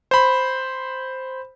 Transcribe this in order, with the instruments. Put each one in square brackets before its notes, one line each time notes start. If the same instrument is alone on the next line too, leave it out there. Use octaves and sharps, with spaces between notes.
[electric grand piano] C5 B5